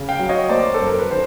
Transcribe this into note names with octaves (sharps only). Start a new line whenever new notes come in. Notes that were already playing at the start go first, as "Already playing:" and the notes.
Already playing: C#3
F5 G5
F#3
C#5 D#5
A#3 C5 D5
A4
F#2
A#4
B4
D#3 C5